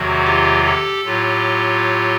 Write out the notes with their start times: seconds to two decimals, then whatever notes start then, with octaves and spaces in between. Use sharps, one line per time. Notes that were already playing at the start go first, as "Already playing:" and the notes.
Already playing: E2 C3 D#3 F#3 F#4
0.22 F4 G4
0.64 G4 A4
1.05 A2 F#3 F4 G4